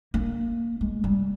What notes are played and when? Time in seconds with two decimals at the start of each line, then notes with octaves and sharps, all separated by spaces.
0.14 A#3
0.81 G#3
1.04 G3